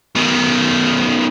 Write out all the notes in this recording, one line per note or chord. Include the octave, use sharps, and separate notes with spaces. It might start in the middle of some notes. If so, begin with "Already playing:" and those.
B2 D#3